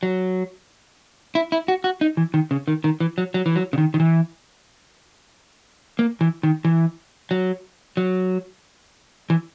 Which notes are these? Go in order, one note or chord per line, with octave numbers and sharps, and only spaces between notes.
F#3
E4
E4
F#4
F#4
D#4
E3
D#3
C#3
D#3
D#3
E3
F#3
F#3
E3
F#3
C#3
D#3
D#3
E3
A#3
E3
D#3
E3
F#3
F#3
E3